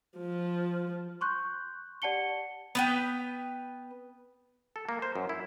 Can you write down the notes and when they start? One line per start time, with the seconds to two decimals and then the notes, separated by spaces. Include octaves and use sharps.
0.18 F3
1.21 C6 C#6 F#6 G6
2.02 G4 D5 F#5 A5 C#7 G7
2.75 B3 B4 G5
4.76 A4
4.89 A#3
5.02 C5
5.16 F#2
5.29 E4